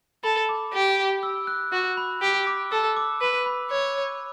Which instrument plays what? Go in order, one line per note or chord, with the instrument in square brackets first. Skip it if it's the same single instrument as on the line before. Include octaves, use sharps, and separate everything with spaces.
[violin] A4 [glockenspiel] B5
[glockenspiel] D6
[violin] G4
[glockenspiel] E6
F#6
[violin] F#4 [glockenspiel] F#6
[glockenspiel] B5
[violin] G4
[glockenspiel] D6
[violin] A4 [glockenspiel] E6
[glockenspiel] D6
[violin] B4
[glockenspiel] B5
[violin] C#5